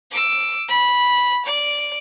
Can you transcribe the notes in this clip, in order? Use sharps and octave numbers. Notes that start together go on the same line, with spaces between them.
D6 E6
B5
D5